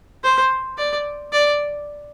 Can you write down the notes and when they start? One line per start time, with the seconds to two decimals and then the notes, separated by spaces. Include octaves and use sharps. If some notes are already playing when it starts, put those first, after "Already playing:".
0.24 C5
0.78 D5
1.32 D5